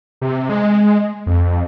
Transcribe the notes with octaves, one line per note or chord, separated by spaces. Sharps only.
C3
G#3
F2